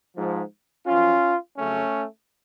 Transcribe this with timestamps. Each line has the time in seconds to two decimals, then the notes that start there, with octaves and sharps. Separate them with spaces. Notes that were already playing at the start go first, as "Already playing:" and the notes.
0.17 G#2 F3
0.87 F#2 F3 C#4 F4
1.57 F2 C#3 F#3 A3 C#4